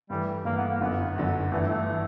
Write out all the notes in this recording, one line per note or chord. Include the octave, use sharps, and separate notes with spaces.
G2 E3 G3 A3
G2 E3 A3 A#3
B3
A#3
G1 F#2 D3 B3
G1 F#2 D3
G1 G2 E3 A3
A3
E3